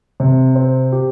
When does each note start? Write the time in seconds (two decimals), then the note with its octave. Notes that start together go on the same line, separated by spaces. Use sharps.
0.20 C3
0.55 C4
0.92 G4